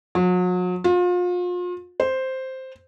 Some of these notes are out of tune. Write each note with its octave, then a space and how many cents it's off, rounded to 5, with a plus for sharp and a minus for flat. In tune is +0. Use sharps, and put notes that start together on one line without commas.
F#3 -40
F4 +35
C5 +0